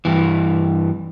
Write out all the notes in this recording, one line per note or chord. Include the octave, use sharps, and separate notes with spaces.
G2 E3